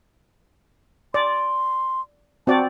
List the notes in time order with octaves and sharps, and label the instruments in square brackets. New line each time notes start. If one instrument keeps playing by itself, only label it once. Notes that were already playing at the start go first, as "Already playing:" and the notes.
[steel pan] D5 [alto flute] C6
[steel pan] C4 F#4 D5 [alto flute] A5